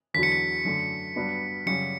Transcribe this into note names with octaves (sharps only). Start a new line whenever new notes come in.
E2 D3 F#3 B6
C#7
B6
F#2 D3 A3
G2 F#3 B3 D4
F#2 C#3 G3 C#4 F#4 C#7